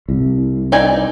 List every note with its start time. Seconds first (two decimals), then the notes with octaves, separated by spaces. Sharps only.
0.09 C2
0.72 D#4 D5 G#5